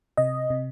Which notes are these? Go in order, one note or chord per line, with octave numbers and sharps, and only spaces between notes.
C3 D#5
C3